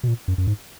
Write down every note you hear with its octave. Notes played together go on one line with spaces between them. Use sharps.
B2
A#2
F#2
F#2
G#2